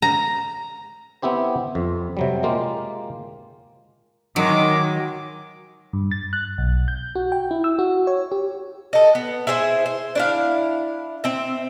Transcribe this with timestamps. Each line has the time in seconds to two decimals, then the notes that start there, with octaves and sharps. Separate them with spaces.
0.02 A#5
1.22 B3 C4 E4 G4 C5
1.75 F2
2.17 C3 F#3 G3
2.43 G#3 A#3 F4 G4
4.36 D#3 F#3 G#3 D6
5.93 G2
6.11 A6
6.33 F#6
6.58 B1
6.88 G6
7.15 F#4
7.32 G5
7.51 E4
7.64 E6
7.79 F#4
8.07 C#5
8.32 G4
8.93 A4 D#5
9.15 B3
9.47 E4 G#4 C5 E5
9.86 C5
10.15 D4 E4 F5
11.24 C4 E5